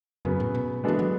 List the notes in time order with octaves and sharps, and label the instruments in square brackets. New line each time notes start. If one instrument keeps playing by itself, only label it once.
[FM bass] F#2 [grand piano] C#3 F#3 B3
[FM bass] A2
B2
[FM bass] E3 [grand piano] G#3 B3 D4 F#4 A4
[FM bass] F#3